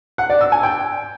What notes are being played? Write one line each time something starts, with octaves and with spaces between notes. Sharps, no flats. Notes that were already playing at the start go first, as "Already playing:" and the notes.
F#5
D5
E6
G#5
G5